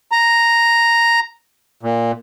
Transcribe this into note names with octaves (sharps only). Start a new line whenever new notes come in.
A#5
A#2